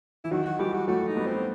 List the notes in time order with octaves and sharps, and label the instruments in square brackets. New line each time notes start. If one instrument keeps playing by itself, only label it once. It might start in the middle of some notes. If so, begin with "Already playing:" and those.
[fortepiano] E3 [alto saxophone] E4
[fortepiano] D#3 F#3 [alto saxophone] F#4
[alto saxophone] F#4
[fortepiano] E3 G3 [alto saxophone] G4
[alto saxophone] F#4
[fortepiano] F#3 A3 [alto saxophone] F#4
[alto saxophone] D#4
[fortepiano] G3 B3
[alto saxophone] C4